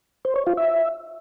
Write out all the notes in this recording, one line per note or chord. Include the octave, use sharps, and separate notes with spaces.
C5
C#5
F4
E5